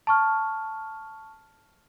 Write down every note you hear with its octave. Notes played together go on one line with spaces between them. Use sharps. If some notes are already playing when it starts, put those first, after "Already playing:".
A5 C#6 F6